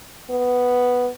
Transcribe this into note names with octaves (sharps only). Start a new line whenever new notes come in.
B3